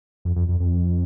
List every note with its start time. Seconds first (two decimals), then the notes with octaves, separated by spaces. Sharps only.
0.25 F2
0.36 F2
0.49 F2
0.60 F2